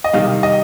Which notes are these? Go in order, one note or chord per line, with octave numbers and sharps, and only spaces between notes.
D#5
C3 D#3 G3 F5
D#5